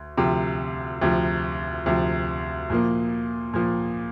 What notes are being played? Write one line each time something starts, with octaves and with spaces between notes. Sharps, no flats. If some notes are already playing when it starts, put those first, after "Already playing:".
Already playing: D2
D2 C3 F3
D2 C3 F3
D2 C3 F3
A#2 F3 A#3
A#2 F3 A#3